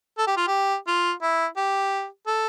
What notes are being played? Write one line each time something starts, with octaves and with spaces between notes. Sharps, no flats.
A4
G4
F4
G4
F4
E4
G4
A4